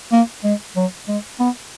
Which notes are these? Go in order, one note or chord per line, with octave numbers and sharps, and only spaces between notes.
A#3
G#3
F#3
G#3
B3